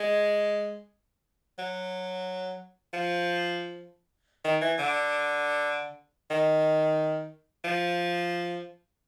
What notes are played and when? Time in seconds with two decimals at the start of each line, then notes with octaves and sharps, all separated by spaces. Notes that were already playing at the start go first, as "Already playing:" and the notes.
Already playing: G#3
1.59 F#3
2.93 F3
4.44 D#3
4.61 E3
4.79 D3
6.30 D#3
7.64 F3